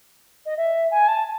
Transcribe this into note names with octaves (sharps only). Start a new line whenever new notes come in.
D#5
E5
G#5
A5